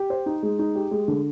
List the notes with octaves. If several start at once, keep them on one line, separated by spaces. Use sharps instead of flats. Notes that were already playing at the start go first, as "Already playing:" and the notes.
Already playing: G4
C5
D#4
G#3
D#4
G4
G#3
D3